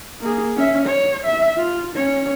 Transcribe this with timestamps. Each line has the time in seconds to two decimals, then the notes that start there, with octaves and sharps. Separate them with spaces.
0.21 A#3 G#4
0.56 C#4 E5
0.86 C#5
1.25 E5
1.57 F4
1.95 C#4 C#5